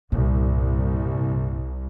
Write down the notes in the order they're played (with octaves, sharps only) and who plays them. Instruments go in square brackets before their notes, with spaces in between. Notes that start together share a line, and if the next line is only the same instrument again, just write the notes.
[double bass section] C2 [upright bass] G2 A#2